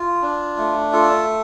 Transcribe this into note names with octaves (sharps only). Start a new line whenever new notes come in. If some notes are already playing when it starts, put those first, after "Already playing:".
Already playing: F4
D4
A3
F4 A4